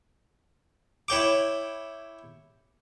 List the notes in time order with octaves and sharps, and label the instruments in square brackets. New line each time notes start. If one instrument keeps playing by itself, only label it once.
[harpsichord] E4 C#5 G5 D6